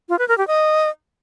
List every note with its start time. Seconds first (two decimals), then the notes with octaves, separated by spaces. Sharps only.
0.09 F4
0.19 B4
0.28 A#4
0.38 G4
0.47 D#5